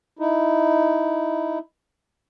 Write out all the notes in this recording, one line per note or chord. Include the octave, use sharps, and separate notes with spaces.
D#4 E4